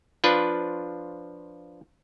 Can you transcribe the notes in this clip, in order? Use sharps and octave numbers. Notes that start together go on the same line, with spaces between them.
F3 D4 F4 B4